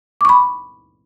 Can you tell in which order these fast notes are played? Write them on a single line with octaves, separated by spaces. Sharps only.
D6 C#6 B5